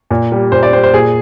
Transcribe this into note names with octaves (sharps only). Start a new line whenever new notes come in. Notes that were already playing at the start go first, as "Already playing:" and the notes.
A#2
G3
A#2 C5
D5
G3 C5
C5
A#2 G#4